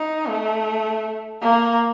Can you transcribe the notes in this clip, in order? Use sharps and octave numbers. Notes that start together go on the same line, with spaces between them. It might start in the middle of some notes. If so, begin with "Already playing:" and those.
Already playing: D#4
A3
A#3